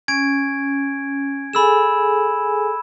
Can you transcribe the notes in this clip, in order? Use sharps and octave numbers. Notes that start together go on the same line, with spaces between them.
C#4 G#5 G#6 D7
G#4 A4 G#5 B5 E6 E7